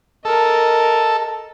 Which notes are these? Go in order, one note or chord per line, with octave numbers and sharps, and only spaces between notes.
A4 A#4 D#5